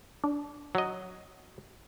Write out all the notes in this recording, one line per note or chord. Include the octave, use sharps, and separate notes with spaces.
D4
F#3 D#5